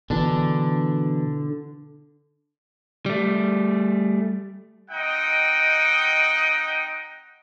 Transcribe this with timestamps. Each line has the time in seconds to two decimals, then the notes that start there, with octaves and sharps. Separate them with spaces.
0.10 B2 D3 E3 D4
3.06 G3 A3
4.91 C4 D#4 D#5 F#5 G5